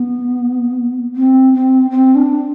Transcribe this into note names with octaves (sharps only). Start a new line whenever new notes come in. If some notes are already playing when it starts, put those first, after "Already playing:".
Already playing: B3
C4
C4
C4
D4